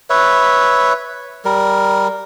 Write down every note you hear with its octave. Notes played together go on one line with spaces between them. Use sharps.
B4 C#5 E5
G3 A#4